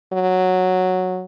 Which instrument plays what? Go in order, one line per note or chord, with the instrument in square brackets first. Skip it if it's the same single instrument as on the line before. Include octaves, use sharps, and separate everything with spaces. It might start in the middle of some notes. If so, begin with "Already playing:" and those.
[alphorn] F#3